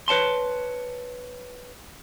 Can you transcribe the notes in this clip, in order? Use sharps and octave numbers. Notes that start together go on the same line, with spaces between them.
B4 C#5 A5 C6